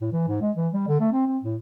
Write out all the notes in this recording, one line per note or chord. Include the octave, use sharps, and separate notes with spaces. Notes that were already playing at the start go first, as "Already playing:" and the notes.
A2
E3
G#2
G#3
E3
G3
D3
A3
C4
C4
A2